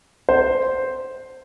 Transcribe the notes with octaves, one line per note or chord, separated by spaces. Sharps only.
C5